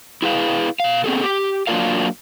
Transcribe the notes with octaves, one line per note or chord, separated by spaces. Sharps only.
E4 G#4 B4 F5
B2 F5
B3 C4 G#4 A4
G4
F#3 A#3 D4 F4 A#4 F5